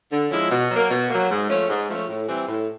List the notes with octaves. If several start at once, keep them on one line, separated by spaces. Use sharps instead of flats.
D3
F3 G#3 C#4 E4
B2
F#3 A#3
B2
F#3 A#3
G#2
F3 A3 C#4
G#2
F3 A3 C#4
A2
E3 G3 C4
A2